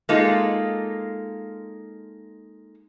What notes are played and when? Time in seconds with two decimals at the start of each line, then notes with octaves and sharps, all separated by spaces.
0.09 G#3 A#3 D#4 F4 A4